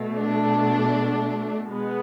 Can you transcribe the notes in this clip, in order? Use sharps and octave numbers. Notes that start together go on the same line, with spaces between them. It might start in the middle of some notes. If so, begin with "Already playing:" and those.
Already playing: B2 A3
D4
G#3 B3